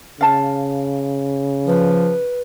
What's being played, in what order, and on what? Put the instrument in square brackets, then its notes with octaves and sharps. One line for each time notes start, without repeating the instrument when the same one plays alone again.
[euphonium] C#3 [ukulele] F5 A5
[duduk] F3 [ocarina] B4